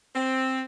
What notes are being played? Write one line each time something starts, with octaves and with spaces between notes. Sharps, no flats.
C4